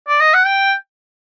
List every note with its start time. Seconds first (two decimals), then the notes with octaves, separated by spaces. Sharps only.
0.08 D5
0.20 D#5
0.34 F#5
0.46 G5